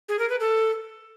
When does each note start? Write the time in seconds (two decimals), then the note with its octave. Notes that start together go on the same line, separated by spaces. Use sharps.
0.09 G#4
0.19 A#4
0.29 B4
0.40 A4